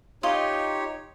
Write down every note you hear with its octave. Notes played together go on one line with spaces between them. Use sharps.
D#4 F4 G4 C#5 D#5 C6